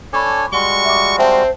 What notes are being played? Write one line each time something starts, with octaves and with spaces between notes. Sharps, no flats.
D4 A4 C#5 G#5 B5 C#6 D6
G3 G#3 F#4 C6 C#6 G7
E5 D6
C4 C5 E5 G5 A5